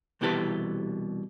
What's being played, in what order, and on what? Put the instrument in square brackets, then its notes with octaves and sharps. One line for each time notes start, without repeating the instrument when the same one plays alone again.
[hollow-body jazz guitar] C2 B2 E3 G4 A4 B4